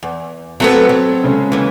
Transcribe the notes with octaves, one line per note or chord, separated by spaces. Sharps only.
E2
F#3 A3 B3 C4 A4
F#3
C#3 G#3 C#4
D#2 E3